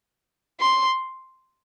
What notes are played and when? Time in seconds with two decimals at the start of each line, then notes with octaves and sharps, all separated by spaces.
0.61 C6